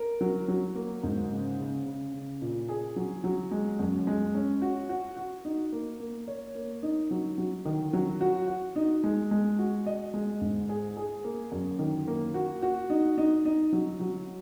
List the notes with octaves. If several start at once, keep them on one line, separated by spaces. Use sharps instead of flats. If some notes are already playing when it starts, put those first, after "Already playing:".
Already playing: A#4
F#3
F#3
A#3
G#2
C#3
C#3
C#3
C#3
A#2
G#4
F#3
F#3
G#3
F#2
G#3
C#4
F#4
F#4
F#4
D#4
A#3
A#3
C#5
A#3
D#4
F#3
F#3
D#3
F#3
F#4
F#4
D#4
G#3
G#3
F#4
D#5
G#3
G#2
G#4
G#4
A#3
F#2
D#3
A#3
F#4
F#4
D#4
D#4
D#4
F#3
F#3